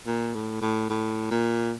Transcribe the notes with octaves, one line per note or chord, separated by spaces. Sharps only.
A#2
A2
A2
A2
A#2